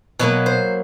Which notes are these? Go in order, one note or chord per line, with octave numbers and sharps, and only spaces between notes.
B2 F#3 A#3 B4
C5